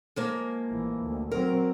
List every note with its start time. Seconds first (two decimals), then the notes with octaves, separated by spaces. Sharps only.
0.16 F3 G#3 A#3
0.69 A1 E3
1.02 D2
1.32 F#3 C4 A#4